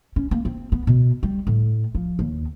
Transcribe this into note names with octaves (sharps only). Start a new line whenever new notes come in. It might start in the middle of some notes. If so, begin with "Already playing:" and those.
C#4
A#3
C4
B3
B2
G3
A2
F3
D#2